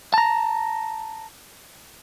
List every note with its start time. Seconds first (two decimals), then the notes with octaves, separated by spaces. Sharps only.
0.14 A5 A#5